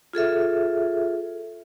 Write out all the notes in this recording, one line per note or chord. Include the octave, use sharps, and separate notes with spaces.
F4 G#4 A4 E5